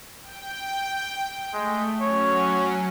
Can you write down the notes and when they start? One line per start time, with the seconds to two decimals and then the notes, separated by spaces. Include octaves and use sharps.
0.22 G5
1.54 G#3 A3
2.01 F#3 C#4 C#5